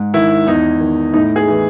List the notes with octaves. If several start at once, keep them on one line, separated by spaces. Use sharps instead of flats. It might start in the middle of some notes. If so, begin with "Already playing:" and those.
Already playing: G#2
D#3 E4
E2 D#4
D#3
A2 D#4
G#4
E3